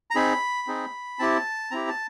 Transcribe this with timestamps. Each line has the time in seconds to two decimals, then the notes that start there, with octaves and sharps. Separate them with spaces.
0.11 A#5
0.15 C4 D#4 G#4 B5
0.67 C4 D#4 G#4
1.19 C4 E4 G4 A5
1.71 C4 E4 G4 A#5
1.89 A5